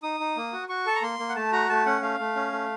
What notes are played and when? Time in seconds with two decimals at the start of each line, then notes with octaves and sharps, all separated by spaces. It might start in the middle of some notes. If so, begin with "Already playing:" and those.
0.03 D#4 D#6
0.20 D#4
0.37 A#3
0.53 F#4
0.69 F#4 C#6
0.86 A4 A5
0.96 A#5
1.02 A#3 C6
1.19 A#3
1.29 F#5
1.36 A3 A5
1.53 F#4 A#5
1.69 A3 A5
1.86 C#4 F#5
2.02 A3 F5
2.19 A3
2.36 C#4
2.52 A3